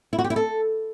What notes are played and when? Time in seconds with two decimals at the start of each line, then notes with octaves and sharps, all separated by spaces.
0.13 E4
0.19 F#4
0.24 G4
0.30 E4
0.36 A4